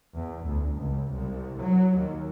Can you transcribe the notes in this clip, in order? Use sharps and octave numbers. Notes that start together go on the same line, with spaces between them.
E2
D2
C#2
C2
F#3
D#2